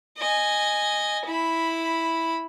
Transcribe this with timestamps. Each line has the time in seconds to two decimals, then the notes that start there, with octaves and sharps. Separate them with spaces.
0.18 D#5 G#5
1.26 E4 B5